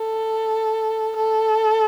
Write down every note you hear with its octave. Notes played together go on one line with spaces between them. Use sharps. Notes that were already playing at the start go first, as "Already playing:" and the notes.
Already playing: A4
A4